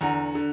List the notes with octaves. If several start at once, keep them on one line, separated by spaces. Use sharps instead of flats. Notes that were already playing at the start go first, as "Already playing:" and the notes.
E2 D3 F#5 A#5
D3